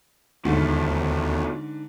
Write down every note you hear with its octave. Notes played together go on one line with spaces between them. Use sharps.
D#2 G#2 B2 D3 A3